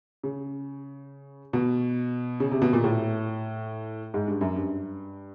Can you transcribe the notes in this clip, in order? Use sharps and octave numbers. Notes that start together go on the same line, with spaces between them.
C#3
B2
C#3
C3
B2
A#2
A2
G#2
G2
F#2
G2